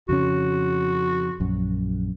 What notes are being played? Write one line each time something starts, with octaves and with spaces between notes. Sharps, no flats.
F2 C#3 C#4 F#4
A#1 F#2